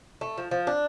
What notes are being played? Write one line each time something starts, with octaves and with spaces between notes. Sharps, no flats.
A3
F3
F3
D4